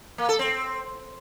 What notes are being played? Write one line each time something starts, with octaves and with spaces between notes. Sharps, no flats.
A#3
A4
C4